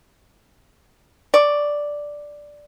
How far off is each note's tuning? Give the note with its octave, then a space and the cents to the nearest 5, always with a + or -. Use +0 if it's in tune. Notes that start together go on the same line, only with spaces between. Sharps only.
D5 +0 C#6 +15